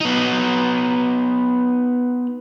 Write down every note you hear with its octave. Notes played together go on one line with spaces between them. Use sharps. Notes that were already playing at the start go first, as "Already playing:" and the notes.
B3 D#4